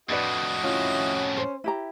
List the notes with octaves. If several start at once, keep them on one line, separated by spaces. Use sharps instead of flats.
F2 A2 D4 F#4 B4 D5 D#5
C#4 E4 F4
C5
E4 G4 A#5